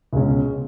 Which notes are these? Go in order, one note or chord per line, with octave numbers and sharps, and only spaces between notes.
C#2 B2 G#3 C#4